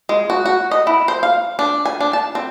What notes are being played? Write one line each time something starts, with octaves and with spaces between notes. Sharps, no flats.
G#3
F#4
F#4
D#5
E4
C5
F5
D4
G#5
D4
A5
C4